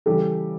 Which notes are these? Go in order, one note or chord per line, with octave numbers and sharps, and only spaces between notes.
C#3 E3 G3 G4 A4